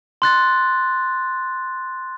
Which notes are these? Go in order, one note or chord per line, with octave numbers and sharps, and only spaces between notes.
C6 F#6 A6